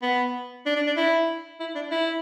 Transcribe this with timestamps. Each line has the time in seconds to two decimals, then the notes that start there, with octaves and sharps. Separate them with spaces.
0.02 B3
0.66 D4
0.76 D4
0.87 D4
0.97 E4
1.60 E4
1.75 D4
1.91 E4